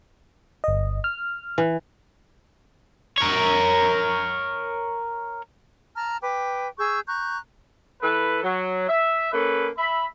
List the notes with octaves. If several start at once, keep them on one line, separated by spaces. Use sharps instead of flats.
G1 D#5
F6
E3
A#4 C#5
A5 A#5 F6
B4 G5 D6
G#4 C#6 E6 G6
A#5 C#6 F#6 G6
E3 A4 B4
F#3
E5
A#3 C#4 A4 B4
E5 B5